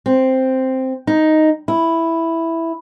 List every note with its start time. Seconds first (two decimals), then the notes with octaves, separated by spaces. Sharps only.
0.06 C4
1.07 D#4
1.68 E4